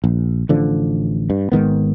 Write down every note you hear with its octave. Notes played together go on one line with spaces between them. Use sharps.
A#1
A1 D3 F3
G2
G#1 G#2 D#3 B3